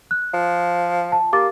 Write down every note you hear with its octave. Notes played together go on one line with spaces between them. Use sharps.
F#6
F3
A5
A#3 G4 D6 A6